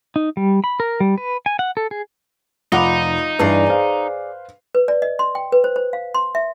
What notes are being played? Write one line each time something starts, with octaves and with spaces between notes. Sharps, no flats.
D#4
G3
B5
A#4
G3
B4
G#5
F#5
A4
G#4
F1 D#4 F4 A#4 F#5 B5 D6
G2 E3 G#4 B4 D5 C7
C5 F5
B4
D5
D#5
C6
G5
B4
C5
C5
F5
C6
E5